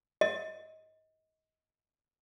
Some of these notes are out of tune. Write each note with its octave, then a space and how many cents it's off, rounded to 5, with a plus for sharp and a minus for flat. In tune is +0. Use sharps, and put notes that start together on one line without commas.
D#5 +25